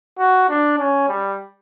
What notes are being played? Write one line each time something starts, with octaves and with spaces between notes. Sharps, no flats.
F#4
D4
C#4
G3